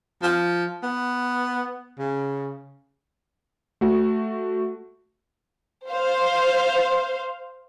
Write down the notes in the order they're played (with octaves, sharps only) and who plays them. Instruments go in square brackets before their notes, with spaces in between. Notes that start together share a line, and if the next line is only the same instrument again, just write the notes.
[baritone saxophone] F3
B3
C#3
[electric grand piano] A3 F#4
[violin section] C5 F5